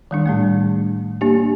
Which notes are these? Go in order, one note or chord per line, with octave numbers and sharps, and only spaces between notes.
D#3 G3 D4
A2 G3 A3
A#3 D4 G4